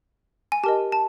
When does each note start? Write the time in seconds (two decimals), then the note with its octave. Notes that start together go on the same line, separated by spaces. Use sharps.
0.52 G#5
0.64 G4 A#4 D#5 A5
0.92 A5